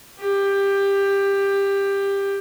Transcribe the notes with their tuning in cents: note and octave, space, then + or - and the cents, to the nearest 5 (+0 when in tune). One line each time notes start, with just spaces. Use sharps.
G4 +15